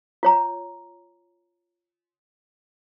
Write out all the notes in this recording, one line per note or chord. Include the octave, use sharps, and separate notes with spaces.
F4 C#5 A#5